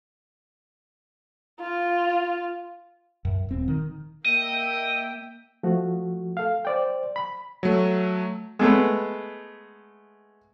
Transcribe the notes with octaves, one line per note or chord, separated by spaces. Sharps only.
F4
F#2
D#1 C4
D#3
A#3 D#5 E5 G5
F3 A3 F#4
A4 F5
C5 D5 G5
B5
F#3 A3
G#3 A3 B3